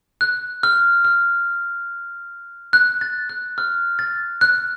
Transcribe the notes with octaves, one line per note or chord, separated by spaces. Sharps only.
F#6
F6
F6
F#6
A6
F#6
F6
A6
F#6